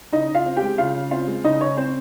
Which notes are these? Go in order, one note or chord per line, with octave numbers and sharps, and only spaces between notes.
C#3 D#4 D#5
C#3
F4 F5
C4
G4 G5
G#3
C#3 F4 F5
C#3
C4 F4 F5
G#3
C#3 D#4 D#5
C#3 C#4 C#5
C4 C5